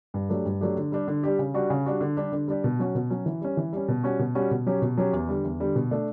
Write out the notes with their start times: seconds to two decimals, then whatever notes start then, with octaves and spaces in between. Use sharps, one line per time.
0.14 G2
0.29 F#3 A3 D4 G4
0.46 G2
0.61 F#3 A3 D4 G4
0.77 D3
0.92 G3 D4 G4
1.08 D3
1.23 G3 D4 G4
1.39 C#3
1.54 G3 D4 F#4
1.70 C#3
1.86 G3 D4 F#4
2.01 D3
2.17 G3 D4 G4
2.32 D3
2.48 G3 D4 G4
2.64 B2
2.79 F#3 C#4 F#4
2.95 B2
3.10 F#3 C#4 F#4
3.26 E3
3.41 G3 C#4
3.57 E3
3.73 G3 C#4
3.88 B2
4.03 G3 C#4 F#4
4.19 B2
4.35 G3 C#4 F#4
4.51 B2
4.66 F#3 C#4 G4
4.82 B2
4.97 F#3 C#4 G4
5.13 E2
5.28 D3 G3
5.44 E2
5.60 D3 G3
5.76 B2
5.91 A3 D4